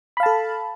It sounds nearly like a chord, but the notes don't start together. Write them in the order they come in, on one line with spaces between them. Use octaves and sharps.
B5 F5 A5 A4